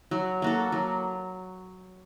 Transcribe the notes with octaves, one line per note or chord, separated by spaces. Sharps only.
F#3
A#3 F#4 A4
F#3